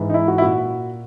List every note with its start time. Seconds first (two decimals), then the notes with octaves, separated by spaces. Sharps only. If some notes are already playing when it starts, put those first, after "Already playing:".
Already playing: G#2 E3
0.10 D#4
0.14 E4
0.28 F#4
0.38 E4
0.42 A#2 F#4